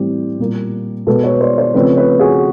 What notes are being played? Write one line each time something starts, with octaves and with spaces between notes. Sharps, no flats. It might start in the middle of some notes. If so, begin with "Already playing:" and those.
Already playing: A2 E3 G3 C4 G4
A#2 G3 A#3
B2 G#3 B3 A4 B4
B4 C#5
C5 D5
C5 D5
C#3 F3 A3 C4 B4 C#5
B4 C#5
F#4 G#4